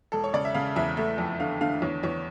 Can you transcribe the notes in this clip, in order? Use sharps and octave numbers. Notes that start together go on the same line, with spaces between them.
E1 A4
C#5
C#3 D5
E5
C#3 F5
E2 E5
A3
F2
D3 F5
D3 F5
E2 C#5
E2 C#5